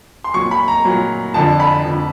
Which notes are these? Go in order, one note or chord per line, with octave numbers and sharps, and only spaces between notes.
C6
A#2 F#3 C#6
B5
A#5
A#2 F#3
F2 D3 F3 A5
B5
F2 D3 F3